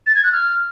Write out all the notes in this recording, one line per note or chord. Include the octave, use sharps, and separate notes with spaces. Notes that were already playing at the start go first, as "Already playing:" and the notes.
A6
G#6
F#6
F6